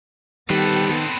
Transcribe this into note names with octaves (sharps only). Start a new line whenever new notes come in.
D#3 G3 B3 C4 G4 A4 B4